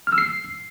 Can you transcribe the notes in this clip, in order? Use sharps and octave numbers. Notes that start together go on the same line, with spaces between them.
F6
E6
C7